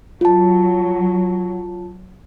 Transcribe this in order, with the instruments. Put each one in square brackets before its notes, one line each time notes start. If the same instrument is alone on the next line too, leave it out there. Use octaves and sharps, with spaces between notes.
[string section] F#3 [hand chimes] F4 A5